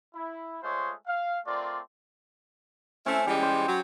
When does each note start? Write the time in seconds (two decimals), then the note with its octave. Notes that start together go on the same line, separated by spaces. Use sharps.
0.13 E4
0.62 G#3 A3 F4 C5 C#5 D#5
1.07 F5
1.46 A3 C4 F4 A#4 D5
3.06 A3 C4 C#4 E4
3.26 E3 G3 G#3 G4
3.42 C5
3.67 F#3